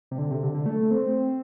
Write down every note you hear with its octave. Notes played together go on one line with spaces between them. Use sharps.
C3
D3
C3
D3
D3
A3
C4